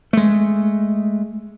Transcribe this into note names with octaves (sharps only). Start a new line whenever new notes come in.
G#3 A3